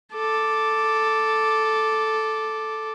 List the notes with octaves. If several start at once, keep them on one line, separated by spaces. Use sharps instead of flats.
A4 D6